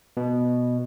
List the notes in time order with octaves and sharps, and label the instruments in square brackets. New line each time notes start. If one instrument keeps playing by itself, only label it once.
[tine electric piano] B2